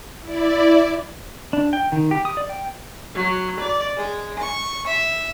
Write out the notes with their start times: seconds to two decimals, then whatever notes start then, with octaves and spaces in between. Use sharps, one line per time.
0.21 E4 D5
1.53 D4
1.73 G5
1.92 D#3
2.11 G4
2.25 D#6
2.37 D5
2.49 G5
3.15 F#3
3.60 D5
3.96 G#3
4.38 C#6
4.86 E5